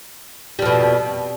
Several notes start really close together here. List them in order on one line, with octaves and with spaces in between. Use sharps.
G3 F2 B2